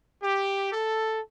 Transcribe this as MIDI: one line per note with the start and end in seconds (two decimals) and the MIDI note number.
0.21 0.68 67
0.73 1.20 69